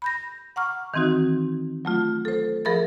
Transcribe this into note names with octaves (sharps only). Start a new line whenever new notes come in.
B5 G6 A#6
F#5 A#5 C#6 D6 F6
D#3 E3 C4 D#4 F#4
F#3 A3 F4
A4 C5
F3 G#4 A#4 E5 B5 A6